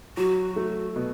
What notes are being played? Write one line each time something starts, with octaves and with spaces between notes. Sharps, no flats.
F#3 F#4
A3
B2